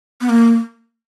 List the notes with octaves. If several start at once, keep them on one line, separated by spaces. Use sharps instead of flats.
B3
A#3